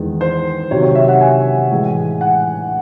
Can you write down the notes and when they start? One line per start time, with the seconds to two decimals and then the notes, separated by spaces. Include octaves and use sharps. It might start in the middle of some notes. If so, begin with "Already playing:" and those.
Already playing: E2 D#3 G#3
0.21 C5
0.71 C3 D#3 F#3 C#5
0.83 C#5
0.95 E5
1.08 F#5
1.21 G#5
1.72 A2 E3 G#3
2.21 F#5